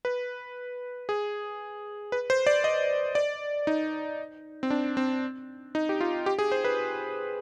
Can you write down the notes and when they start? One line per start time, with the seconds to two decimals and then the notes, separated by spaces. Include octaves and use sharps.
0.05 B4
1.09 G#4
2.12 B4
2.30 C5
2.47 D5
2.64 D#5
3.15 D5
3.67 D#4
4.63 C4
4.70 D4
4.97 C4
5.75 D#4
5.89 G4
6.01 F4
6.26 G4
6.39 G#4
6.52 C5
6.64 B4